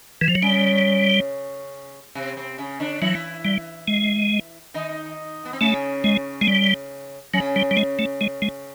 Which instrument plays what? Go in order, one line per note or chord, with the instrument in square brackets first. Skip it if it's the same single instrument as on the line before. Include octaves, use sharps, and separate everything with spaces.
[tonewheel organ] E3
F3
F#3
[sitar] C#3 C#4 [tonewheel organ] G3
[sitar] C3 C4
C3 C4
C#3 C#4
D3 D4
[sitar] E3 E4 [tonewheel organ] F#3
[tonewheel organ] G3
G#3
[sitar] D#3 D#4
B3
C4
[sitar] C#3 C#4 [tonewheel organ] A3
[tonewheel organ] G#3
G#3
G3
[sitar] C#3 C#4 [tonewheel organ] F#3
[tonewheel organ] G3
G3
G#3
A3
G#3
G#3